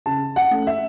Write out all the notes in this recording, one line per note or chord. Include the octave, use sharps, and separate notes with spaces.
C#3 A5
F#5
A3 C#4
E5